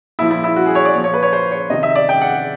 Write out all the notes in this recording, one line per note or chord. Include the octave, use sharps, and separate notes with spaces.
A#2 F3 E4
E4
E4
F#4
G#4
C#5
D5
A#2 F3
C#5
B4
C#5
C5
C#5
C3 D#3 D#5
E5
D5
G5
F#5